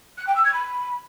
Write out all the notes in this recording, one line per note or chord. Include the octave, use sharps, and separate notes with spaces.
F#6
G5
E6
G#6
B5